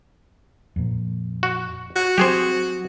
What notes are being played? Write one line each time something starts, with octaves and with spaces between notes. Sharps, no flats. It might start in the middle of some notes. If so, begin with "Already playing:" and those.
F2 A#2
F#4
F#4
F#3 C4 G4 G#4 C5